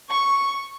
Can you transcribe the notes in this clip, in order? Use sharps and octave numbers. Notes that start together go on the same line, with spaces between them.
C#6